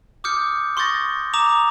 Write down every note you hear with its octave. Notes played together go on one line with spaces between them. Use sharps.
D6 D#6 F6 G6 C#7
C6 C#6 D#6 G6 A6 A#6
A#5 D6 D#6 E7 F7